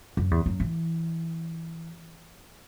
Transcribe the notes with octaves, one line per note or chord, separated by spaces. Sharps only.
F#2
E2
F#2
E3